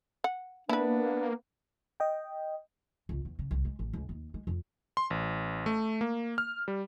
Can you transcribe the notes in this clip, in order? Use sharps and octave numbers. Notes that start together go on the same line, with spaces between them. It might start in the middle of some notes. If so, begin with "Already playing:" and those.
F#5
A#3 B3 D4 E4 B4
D#5 G5
C#2
E2
C#3
C2
G#3
A1
C#2
D#2
G#3
F2
C6
A1
A3
A#3
F6
G3